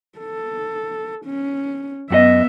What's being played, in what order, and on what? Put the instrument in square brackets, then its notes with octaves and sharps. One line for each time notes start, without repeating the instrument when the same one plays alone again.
[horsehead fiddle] A4
C#4
[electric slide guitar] F#2 F#4 D#5 [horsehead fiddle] B3 E5